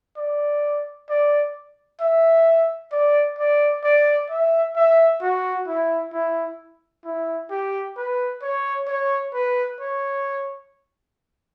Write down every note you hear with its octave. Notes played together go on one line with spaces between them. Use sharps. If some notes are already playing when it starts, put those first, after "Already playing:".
D5
D5
E5
D5
D5
D5
E5
E5
F#4
E4
E4
E4
G4
B4
C#5
C#5
B4
C#5